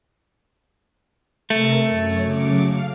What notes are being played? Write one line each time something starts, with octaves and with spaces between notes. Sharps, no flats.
C3 A3 A#4 E6
F#2 C#5
C#3 F#3 D6
F5